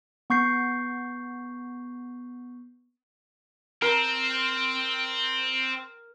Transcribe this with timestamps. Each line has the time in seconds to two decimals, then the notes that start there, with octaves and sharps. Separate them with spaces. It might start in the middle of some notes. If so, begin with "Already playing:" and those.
0.30 B3 C#6 G6 C7
3.82 C4 A#4